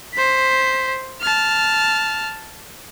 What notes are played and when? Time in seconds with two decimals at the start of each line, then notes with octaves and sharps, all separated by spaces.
0.14 C5 B6
1.21 A5 F6